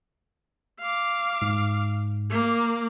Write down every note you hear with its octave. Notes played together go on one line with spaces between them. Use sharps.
F5 D6
G#2
A#3 D6